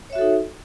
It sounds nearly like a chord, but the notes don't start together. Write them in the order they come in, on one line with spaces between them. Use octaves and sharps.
C#5 E5 F#4 A4 D#4